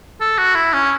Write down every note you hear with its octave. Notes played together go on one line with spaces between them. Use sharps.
A4
F#4
E4
C#4